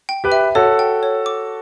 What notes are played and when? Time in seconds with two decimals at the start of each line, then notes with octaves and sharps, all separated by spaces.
0.09 G5
0.24 G4 B4
0.32 E5
0.55 F#4 A4 C#5
0.79 G5
1.03 C#5
1.26 D6